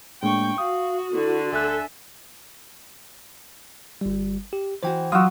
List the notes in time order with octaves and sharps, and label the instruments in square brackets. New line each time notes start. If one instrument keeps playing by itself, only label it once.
[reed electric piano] A2 G#3 A#3 [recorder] D4 [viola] G5 C#6
[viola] F#4 [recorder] F5 [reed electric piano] D#6
[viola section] D3 [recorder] E4
[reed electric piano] D2 F#6 [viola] A4 E5 [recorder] G#5
[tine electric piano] G1 G3
G4
[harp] E3 F#4 [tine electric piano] C5 G5
[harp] F#3 [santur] F4 F#4 [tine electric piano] D#6 E6